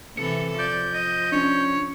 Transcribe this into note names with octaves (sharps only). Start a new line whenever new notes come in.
C3 E3 A4 C#7
F3 D5 G6
D#5
C#4 D4 C#5